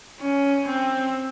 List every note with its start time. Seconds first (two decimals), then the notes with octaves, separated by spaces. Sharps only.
0.21 C#4
0.67 C4